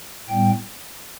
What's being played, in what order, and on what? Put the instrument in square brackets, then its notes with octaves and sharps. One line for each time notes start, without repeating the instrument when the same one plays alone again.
[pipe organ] A2 G3 B3 G5